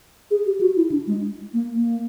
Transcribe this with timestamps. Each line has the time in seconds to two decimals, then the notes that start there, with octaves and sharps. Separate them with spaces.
0.31 G#4
0.46 G4
0.61 F#4
0.77 E4
0.92 D4
1.07 G#3
1.53 A#3
1.75 A#3